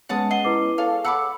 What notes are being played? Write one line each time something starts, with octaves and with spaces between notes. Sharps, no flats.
G#3 B3 C#4 F#5 A5 D#6
D#5 F#5 C7 G7
E4 B4 D6
G#4 A4 C#5 F5
F#5 B5 D6 E6 C#7